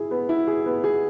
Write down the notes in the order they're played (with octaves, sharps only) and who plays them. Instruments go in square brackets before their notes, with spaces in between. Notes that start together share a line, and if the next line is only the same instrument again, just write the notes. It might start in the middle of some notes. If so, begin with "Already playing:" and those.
Already playing: [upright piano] E4 G#4
B3
E4
G#4
B3
G#4